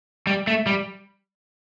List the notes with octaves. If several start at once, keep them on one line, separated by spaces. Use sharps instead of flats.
G3
A3
G3